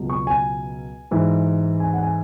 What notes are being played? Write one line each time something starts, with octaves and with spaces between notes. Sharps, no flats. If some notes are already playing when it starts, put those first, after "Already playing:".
Already playing: C#2 B2 F#3
C#6
G#5
G#2 E3
G#5
F#5
G#5